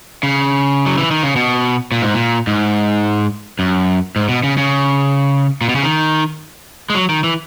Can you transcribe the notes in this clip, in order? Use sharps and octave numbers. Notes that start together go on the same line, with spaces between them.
C#3
F#3
E3
D#3
C#3
B2
A#2
G#2
A#2
G#2
F#2
G#2
B2
C#3
C#3
A#2
B2
C#3
D#3
G#3
F#3
D#3
E3